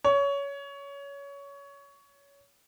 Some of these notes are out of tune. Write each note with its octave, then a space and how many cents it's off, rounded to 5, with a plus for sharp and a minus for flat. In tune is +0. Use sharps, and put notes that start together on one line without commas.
C#5 +20